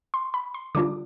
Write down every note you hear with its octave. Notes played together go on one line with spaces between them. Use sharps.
C6
B5
C6
D3 G3 D4 F4 D6